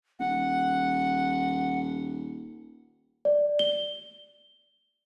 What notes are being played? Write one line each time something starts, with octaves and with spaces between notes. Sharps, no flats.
D#1 F#5
D5
G7